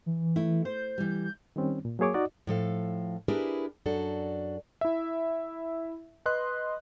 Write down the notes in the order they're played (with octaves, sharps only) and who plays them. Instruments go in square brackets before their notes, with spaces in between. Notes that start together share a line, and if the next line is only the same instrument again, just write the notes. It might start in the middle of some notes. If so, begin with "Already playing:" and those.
[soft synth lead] E3
[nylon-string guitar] A3 E4
[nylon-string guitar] C5 [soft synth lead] G6
[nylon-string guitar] E3 G3
[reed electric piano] D#3 G3 C4 C#4
A#2
F#3 A#3 G#4 C#5 D6
D#4 F#4 D5 D#5
[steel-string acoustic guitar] A2 F3 A4 F5
D4 E4 G4 G#4 A#4 B4
F#2 D4 F#4 A4
[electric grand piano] E4 E5
B4 D#5 C6 F#6